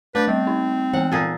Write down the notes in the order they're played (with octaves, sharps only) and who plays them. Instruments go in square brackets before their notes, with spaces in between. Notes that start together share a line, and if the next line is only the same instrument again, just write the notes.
[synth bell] A3 G6 [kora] D4 [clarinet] B4
[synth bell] G3 [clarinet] C4
[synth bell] D#4
[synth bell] E3 B3 [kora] F#5
[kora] A#2 G#4 A4